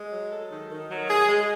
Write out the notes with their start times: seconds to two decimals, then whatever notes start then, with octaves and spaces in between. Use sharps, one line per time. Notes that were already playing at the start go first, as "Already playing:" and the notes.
Already playing: G#3
0.12 F#3
0.32 A4
0.52 D#3
0.71 D#3
0.90 F#3
1.10 G#4
1.29 G#3